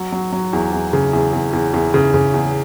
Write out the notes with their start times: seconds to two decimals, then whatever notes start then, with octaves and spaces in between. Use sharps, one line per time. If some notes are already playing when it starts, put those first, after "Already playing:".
Already playing: F#3
0.12 F#3
0.32 F#3
0.53 E2
0.73 E2
0.93 C#3
1.13 E2
1.33 E2
1.53 E2
1.74 E2
1.94 C#3
2.14 C#3
2.34 E2